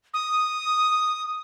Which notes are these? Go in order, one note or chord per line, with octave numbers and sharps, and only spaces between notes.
D#6